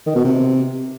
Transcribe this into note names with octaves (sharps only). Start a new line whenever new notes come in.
D#3
B2
C3